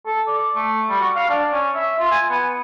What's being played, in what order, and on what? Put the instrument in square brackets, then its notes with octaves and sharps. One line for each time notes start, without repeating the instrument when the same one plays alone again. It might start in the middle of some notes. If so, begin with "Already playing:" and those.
[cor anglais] A4
D5
A3
G3
F#4
F5
D4
C#4
E5
F4
G#5
B3